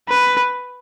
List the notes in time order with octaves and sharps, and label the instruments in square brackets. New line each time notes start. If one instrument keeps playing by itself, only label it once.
[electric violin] B4